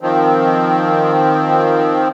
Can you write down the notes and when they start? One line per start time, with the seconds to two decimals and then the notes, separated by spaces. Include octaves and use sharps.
0.01 D#3 F3 C4